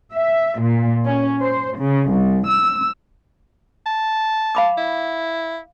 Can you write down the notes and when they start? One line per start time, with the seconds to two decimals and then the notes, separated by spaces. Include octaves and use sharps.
0.14 E5
0.62 A#2
1.05 C#4
1.41 C5
1.78 C#3
2.10 C2
2.48 E6
3.86 A5
4.55 F5 B5 D6
4.77 E4